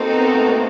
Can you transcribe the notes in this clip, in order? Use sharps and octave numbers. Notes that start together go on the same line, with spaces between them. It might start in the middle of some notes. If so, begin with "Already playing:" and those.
Already playing: A#3 C4 D#4 F#4 A4
B3
A#3
A3
A#3